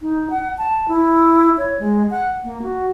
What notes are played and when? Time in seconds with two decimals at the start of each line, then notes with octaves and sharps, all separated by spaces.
0.02 D#4
0.30 F#5
0.58 A5
0.88 E4
1.58 C#5
1.79 G#3
2.11 F#5
2.44 A#3
2.62 F#4